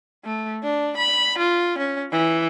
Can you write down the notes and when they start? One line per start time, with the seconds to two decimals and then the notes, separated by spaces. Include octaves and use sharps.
0.24 A3
0.63 D4
0.97 B5
1.38 F4
1.78 C#4
2.12 E3